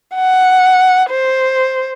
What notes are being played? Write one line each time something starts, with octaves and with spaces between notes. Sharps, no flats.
F#5
C5